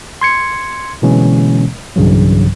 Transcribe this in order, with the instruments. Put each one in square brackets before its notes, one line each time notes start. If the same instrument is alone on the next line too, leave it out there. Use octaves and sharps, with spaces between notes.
[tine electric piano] C6 G#6 C#7
B2 D3 E3 G#3 A#3 C#4
B1 G2 C#3 E3 F#3